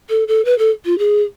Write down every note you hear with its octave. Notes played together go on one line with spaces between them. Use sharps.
A4
A4
B4
A4
F4
G#4